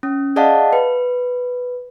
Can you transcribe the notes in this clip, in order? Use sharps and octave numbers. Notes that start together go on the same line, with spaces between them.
C#4
G#4 D5 D#5 F5 F#5 A5
B4